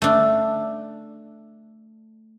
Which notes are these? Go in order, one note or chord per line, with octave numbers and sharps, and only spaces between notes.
A3 D4